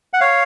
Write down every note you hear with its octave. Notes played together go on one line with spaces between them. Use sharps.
F#5
C#5 F5